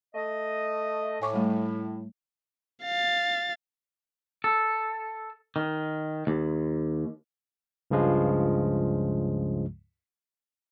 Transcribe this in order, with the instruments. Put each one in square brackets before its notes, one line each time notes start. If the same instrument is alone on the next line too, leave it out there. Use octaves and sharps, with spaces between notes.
[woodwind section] A3 D#5
[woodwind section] A2 [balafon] G#5 C#6 D6
[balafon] G3 A3
[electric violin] F5 A6
[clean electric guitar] A4
D#3
D#2
[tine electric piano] C#2 G2 C#3 F3 G#3